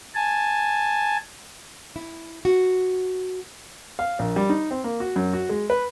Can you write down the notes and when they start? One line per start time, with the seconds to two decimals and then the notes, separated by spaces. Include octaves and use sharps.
0.15 G#5 A5
1.96 E4
2.45 F#4
3.99 F5
4.19 A#1
4.36 G3
4.50 D#4
4.71 C4
4.84 A#3
5.00 F#4
5.16 F#2
5.33 F#4
5.49 G#3
5.70 B4